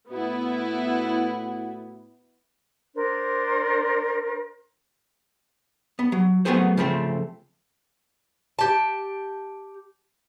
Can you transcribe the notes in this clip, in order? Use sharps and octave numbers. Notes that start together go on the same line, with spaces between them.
A2 B3 E4 F#4
D4 A#4 C5 D5
B3
F#3
F#3 A3 B3 C4 G#4 C5
C#3 F3 A3 C4
G4 A5